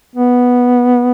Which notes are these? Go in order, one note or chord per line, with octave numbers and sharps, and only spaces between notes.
B3